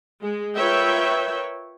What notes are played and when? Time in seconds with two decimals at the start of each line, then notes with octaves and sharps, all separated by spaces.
0.22 G#3
0.55 F4 A#4 B4 C#5 E5 G5